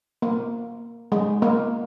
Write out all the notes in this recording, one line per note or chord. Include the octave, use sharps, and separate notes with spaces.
A#3
G#3
A#3